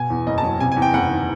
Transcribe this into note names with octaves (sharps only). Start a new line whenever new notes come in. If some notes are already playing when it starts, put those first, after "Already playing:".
Already playing: B2 G#5
E2
F#1 D#5
A5
F#3
C3 G#5
G#5
E2
G5
F#1 F#5
D#3